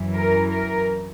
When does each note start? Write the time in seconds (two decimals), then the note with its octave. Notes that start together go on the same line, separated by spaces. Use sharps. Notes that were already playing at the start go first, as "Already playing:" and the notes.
Already playing: F#2 E3
0.16 A#4
0.52 A#4